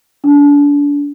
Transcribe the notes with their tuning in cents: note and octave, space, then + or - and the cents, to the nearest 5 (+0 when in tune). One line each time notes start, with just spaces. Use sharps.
D4 -35